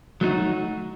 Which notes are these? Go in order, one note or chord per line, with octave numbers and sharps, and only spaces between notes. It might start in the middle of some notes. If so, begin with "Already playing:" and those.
F#3 A3 D#4 F#4